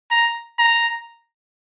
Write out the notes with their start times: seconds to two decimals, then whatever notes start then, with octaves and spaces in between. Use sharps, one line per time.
0.11 A#5
0.59 A#5